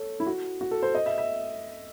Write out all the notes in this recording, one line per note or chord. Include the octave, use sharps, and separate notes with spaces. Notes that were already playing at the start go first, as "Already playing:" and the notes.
Already playing: A4 C#5
E4
F#4
F#4
A4
C5
D#5
E5
E5